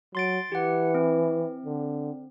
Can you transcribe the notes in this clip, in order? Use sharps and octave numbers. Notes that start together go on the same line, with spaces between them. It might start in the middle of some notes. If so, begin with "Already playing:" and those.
F#3 C6 A6 D7
E3 G4 F#5
C4
D3